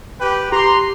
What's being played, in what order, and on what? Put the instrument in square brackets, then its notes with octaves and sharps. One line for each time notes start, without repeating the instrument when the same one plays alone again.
[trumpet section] G4 B4 G5
[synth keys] G4 D6 [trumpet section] A#5 C6